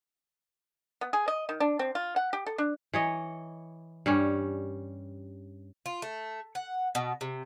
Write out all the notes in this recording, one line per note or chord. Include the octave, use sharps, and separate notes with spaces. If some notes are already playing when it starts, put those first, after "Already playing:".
B3
G#4
D#5
D#3
D4
C4
F4
F#5
G4
A4
D4
E3 C#5 D#5
G2 G3 C#4
F4
A3
F#5
B2
C3